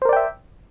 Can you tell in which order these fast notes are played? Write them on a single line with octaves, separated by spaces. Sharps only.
C5 A#4 D5 G5 E5